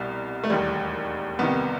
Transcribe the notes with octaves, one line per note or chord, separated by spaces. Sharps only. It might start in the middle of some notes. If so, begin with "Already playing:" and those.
Already playing: C2 B2 G3
A3
E1 D#2 D#3 G3
C2 C3 D#3 B3